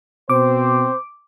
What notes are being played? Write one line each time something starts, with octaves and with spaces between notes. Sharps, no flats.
B2 C4 C5 D6